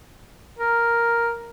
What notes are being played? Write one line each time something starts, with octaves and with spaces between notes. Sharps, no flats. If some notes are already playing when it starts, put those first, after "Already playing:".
A#4